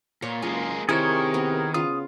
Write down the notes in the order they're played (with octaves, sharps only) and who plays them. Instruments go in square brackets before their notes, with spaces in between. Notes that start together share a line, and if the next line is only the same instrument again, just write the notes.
[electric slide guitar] A#2 [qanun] C#5
[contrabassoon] F#1 [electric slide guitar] G#3 A#3 G#4 [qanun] F4
[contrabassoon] C3 [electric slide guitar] D#3 [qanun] E4 C5 [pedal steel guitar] G#4 A#4 C#5
[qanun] B3
[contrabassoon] C#3 [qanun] F4 [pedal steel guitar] D#6